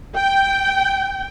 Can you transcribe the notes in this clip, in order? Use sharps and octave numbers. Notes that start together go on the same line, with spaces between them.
G5